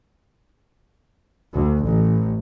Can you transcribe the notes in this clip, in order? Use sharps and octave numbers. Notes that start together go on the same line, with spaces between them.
D2
A1